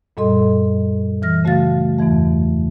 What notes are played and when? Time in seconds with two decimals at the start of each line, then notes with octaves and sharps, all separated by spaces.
0.17 F#2 A#2 G3 A4 D#5 C6
1.22 E3 F6 A#6
1.44 C#3 A3 F#4 F5 A6
1.99 E2 G2 E3 A3